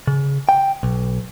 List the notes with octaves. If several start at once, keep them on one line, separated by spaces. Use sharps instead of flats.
C#3
G5
B1